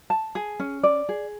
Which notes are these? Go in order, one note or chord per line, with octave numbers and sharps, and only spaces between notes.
A5
G#4
C#4
D5
G#4